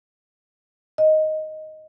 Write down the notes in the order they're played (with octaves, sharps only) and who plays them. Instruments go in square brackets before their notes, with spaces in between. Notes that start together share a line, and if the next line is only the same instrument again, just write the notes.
[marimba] D#5